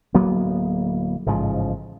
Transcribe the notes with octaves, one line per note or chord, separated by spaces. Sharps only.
D1 F#3 A#3 B3
A1 G#2 C#3 F3